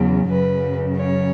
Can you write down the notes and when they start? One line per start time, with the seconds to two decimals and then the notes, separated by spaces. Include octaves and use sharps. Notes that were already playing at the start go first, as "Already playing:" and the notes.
Already playing: E2 C#3 F#3
0.29 F#2 C#3 F#3 B4
0.97 C#5